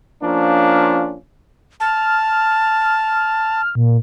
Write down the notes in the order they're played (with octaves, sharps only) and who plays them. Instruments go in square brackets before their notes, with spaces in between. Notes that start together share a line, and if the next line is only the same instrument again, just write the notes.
[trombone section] F3 A#3 C#4 D4 F4
[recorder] A5 [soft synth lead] F6
[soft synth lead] A#2